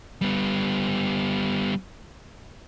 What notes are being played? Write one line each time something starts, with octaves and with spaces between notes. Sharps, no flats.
G3 B3